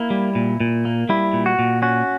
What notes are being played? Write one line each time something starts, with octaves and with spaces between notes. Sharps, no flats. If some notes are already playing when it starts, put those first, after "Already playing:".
Already playing: A#3 E4
G3
A#2
A#2
A#3
G3 E4
A#2
F#4
A#2
C#4 F#4